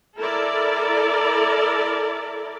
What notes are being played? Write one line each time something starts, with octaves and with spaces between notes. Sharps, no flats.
E4 A4 A#4 D5